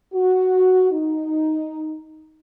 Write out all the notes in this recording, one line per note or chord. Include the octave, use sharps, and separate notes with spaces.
F#4
D#4